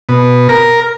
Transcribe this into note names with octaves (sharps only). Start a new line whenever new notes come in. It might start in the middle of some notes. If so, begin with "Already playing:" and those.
B2
A#4